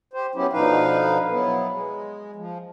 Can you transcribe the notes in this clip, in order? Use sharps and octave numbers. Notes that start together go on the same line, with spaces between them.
G4 C5
F#3 B3 C#4 E4 G4
B2 D3 F3 D#4 B4 F5
F#3 B3 E4
G#3
F3